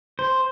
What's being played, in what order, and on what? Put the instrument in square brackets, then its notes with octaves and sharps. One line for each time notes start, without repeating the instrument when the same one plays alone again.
[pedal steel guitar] C5